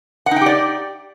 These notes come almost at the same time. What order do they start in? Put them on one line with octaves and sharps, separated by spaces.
F#5 D#4 G5 G4 D5